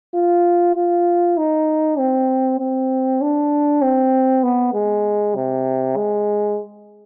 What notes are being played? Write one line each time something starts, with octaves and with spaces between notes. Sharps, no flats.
F4
F4
D#4
C4
C4
D4
C4
B3
G#3
C3
G#3